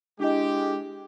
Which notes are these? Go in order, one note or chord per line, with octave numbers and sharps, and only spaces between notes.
G#3 D4 E4 G4 D#5